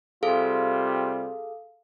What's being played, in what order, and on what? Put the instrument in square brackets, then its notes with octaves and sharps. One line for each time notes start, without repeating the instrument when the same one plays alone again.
[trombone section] C3 G3 F4 [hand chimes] G#4 A4 F5